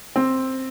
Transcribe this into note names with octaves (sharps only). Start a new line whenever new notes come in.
C4